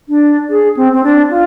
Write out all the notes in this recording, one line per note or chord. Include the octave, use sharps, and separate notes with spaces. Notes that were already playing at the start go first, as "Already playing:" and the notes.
D4
G#4
C4
C4
D4
F4